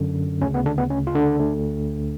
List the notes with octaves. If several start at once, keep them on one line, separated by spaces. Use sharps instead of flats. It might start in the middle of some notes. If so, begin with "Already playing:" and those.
Already playing: F#2 D3
D2 C#3 C#4
B3
D3 D4
B3
C#4
F4
D3 D4
D2 D3